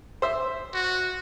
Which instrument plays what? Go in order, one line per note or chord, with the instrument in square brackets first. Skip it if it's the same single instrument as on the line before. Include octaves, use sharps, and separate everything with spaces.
[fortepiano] C5 E5
[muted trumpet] F#4